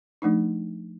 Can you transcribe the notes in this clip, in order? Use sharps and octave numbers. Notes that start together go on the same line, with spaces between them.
F3 A3 D4 D#4